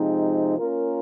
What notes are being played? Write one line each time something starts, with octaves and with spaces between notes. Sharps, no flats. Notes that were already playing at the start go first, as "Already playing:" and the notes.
Already playing: C3 F3 G#3 C4 D#4
A#3 C#4 F4 A#4